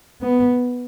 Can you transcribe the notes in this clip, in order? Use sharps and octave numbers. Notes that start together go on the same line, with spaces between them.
B3